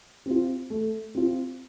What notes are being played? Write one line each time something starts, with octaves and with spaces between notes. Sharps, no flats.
C4 F4
A3
C4 F4